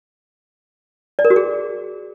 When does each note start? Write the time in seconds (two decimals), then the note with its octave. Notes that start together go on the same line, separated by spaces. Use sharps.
1.19 D5
1.25 A#4
1.30 F#4
1.36 G#4